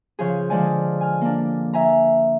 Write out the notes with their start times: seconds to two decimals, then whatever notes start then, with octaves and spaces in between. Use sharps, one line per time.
0.19 C#3 F3 G#4
0.50 D3 F3 G#3 D5 G#5
1.01 G#5 F6
1.21 A#3 D4
1.73 E5 G#5 A#5